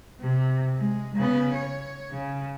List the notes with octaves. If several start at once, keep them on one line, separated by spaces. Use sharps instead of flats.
C3
G#3
C#3 B3
C#5
C#3